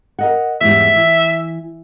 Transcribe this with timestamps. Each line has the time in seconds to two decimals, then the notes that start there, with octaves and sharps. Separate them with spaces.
0.19 A#4 D#5 F#5
0.61 E2 G#2 G3 E5
0.96 E3